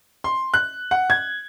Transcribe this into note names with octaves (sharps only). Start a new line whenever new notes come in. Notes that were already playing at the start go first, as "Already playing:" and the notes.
C6
F#6
F#5
G#6